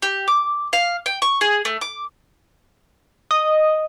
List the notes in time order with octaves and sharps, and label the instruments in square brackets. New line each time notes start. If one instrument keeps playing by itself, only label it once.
[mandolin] G4
D6
F5
G5
C#6
G#4
A3
D6
[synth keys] D#5